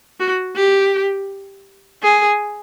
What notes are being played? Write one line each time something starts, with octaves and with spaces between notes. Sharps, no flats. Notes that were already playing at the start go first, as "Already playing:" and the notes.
F#4
G4
G#4